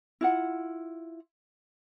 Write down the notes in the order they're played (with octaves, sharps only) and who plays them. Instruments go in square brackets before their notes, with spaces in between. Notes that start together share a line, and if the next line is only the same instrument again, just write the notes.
[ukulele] E4 F4 F#5